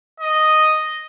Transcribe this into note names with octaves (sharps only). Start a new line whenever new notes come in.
D#5